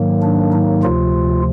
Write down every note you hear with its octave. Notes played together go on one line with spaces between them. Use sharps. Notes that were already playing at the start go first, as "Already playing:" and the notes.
Already playing: G#2 D#3 F#3 A#3
D4
D#4
D2 C3 F3 F4